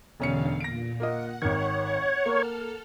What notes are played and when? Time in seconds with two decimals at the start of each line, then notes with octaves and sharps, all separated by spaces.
0.20 E1 E2 D3 C#4 F5 C#7
0.61 A#2 A#6 D7
1.00 A#3 F4 D#5 F#5
1.42 G#1 D#3 C#5
2.26 A#3 A4 F6